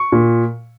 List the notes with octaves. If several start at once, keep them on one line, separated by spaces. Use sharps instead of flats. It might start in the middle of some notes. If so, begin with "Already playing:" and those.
Already playing: C#6
A#2